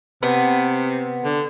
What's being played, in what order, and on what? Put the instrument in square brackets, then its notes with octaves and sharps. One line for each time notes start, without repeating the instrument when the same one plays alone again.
[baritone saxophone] C3 [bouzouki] B3
[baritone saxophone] D3